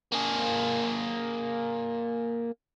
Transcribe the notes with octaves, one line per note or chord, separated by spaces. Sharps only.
A#3 G#4